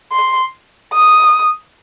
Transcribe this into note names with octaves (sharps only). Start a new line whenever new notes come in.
C6
D#6